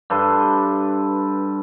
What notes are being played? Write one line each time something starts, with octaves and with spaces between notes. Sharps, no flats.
G2 A4 B4 C6